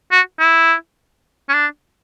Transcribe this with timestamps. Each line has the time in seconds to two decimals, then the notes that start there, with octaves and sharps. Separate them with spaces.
0.12 F#4
0.40 E4
1.49 C#4
1.54 D4